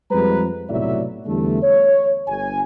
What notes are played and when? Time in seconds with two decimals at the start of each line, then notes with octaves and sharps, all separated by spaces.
0.11 F2 G3 G#3 B4 A#5
0.69 B1 A2 C3 F#3 D5 E5
1.27 E2 D3 G3 A3
1.63 C#5
2.28 G1 G#5